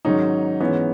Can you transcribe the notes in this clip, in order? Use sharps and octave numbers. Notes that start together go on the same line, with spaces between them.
G#2 D#3 F#3 C#4 D#4
G#2 E3 B3 C#4